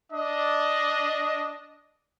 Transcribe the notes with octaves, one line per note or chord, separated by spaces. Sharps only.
D4 D#5